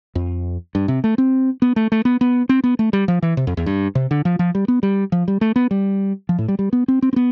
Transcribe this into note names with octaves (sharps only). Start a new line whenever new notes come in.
F2
G2
C3
A3
C4
B3
A3
A3
B3
B3
C4
B3
A3
G3
F3
E3
C3
F2
E2
G2
C3
D3
F3
F3
G3
B3
G3
F3
G3
A3
B3
G3
F3
A2
G3
G3
B3
C4
C4
C4
B3